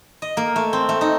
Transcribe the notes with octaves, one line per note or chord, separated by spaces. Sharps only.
D#5
A#3
A3
C4
A3
D#4